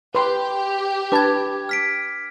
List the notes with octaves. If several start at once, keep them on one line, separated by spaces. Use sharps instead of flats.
G4 B4 C6
D4 B4 A5 D6 G#6
F6 B6 D7